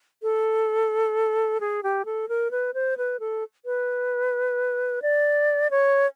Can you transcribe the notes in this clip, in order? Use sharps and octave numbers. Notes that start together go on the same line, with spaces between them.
A4
G#4
G4
A4
A#4
B4
C5
B4
A4
B4
D5
C#5